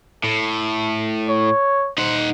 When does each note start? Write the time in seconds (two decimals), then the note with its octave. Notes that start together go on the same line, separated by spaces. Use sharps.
0.24 A2 A4
1.29 C#5
1.98 D#4 C5 F#5